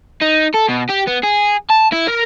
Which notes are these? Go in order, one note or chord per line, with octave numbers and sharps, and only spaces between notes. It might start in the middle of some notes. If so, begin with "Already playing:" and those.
D#4
A4
B2
G4
B3
G#4
A5
E4
A#4